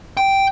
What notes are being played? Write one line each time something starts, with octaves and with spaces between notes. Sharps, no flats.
G5